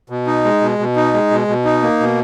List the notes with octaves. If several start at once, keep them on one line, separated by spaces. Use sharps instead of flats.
B2
D#4
G#3
B2
B2
D#4
G#3
B2
B2
D#4
A#3
B2